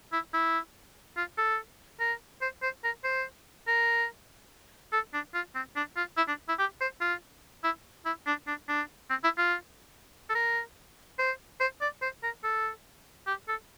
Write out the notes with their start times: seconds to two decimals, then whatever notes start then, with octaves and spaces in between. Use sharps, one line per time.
0.12 E4
0.33 E4
1.17 F4
1.38 A4
2.00 A#4
2.42 C5
2.62 C5
2.84 A#4
3.04 C5
3.67 A#4
4.92 A4
5.13 D4
5.34 F4
5.55 C4
5.76 D4
5.96 F4
6.17 E4
6.28 D4
6.49 E4
6.59 G4
6.81 C5
7.01 F4
7.64 E4
8.05 E4
8.27 D4
8.47 D4
8.68 D4
9.10 C4
9.24 E4
9.38 F4
10.30 A4
10.35 A#4
11.19 C5
11.60 C5
11.81 D5
12.02 C5
12.23 A#4
12.44 A4
13.27 G4
13.48 A4